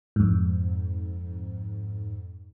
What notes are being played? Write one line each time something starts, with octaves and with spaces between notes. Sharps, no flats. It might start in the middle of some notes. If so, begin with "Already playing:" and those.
F2 G#2